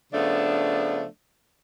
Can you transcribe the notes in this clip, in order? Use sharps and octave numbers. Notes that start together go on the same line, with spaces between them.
C#3 F3 A3 B3 D4